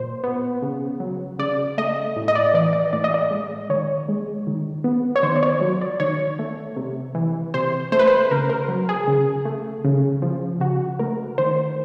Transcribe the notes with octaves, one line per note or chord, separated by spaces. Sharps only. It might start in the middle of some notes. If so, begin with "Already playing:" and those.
Already playing: A#2 C5
B3
C#3
F#3
C#3 D5
A3 D#5
A2
D#5
D5
E3 D5
D5
A2 D5
D#5
D5
G#3
D#3 C#5
G#3
D#3
B3
C#5
D#3 C5
D5
C#5
F#3
D5
D#3 C#5
A3
C3
E3
C3 C5
A3 C5
B4
C5
C#3 A#4
A#4
F#3
G#4
C#3
A3
C#3
F3
C#3 F#4
A3 A#4
D#3 C5